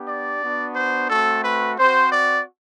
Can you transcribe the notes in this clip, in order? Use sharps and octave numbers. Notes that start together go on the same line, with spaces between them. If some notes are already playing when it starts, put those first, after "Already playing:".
Already playing: B3 D4 G4
D5
B3 D4 F#4
C5
A3 C4 F#4 A4
B4
C4 F#4 C5
D5